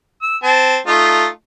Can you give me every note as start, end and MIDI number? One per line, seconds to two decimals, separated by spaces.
0.23 0.37 88
0.43 0.78 60
0.43 0.78 81
0.87 1.27 57
0.87 1.27 63
0.87 1.27 65